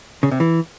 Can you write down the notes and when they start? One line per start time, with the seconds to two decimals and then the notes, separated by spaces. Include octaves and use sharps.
0.23 C#3
0.32 C3
0.40 E3